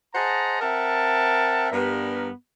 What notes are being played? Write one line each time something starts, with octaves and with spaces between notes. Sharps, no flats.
G#4 C5 D#5 F#5 A5 A#5
C4 A#4 E5 F#5 A5
G2 B3 A#4